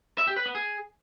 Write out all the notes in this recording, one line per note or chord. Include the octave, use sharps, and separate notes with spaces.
E5
G4
B4
B3
G#4